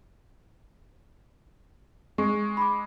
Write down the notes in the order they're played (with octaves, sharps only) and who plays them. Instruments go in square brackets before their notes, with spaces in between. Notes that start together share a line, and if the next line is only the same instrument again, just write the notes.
[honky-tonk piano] G#3 [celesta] C#6
[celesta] B5 D6